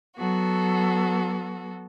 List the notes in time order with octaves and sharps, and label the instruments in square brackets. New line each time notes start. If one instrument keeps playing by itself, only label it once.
[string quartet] F#3 B3 F#4 A4